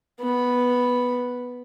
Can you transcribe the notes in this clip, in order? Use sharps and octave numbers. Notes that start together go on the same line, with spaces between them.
B3 B5